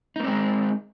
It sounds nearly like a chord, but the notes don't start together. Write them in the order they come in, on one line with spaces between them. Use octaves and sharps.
D#4 A#3 C4 G#3